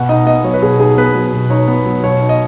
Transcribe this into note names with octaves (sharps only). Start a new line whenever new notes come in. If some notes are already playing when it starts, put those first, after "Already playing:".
Already playing: B2 F#5
D#4 D#5
B3 D#5
F#3 C#5
B4
B2 G#4
D#4 G#4
B3 B4
F#3
B2
D#4 C#5
B3
F#3
B2 C#5
D#4
D#5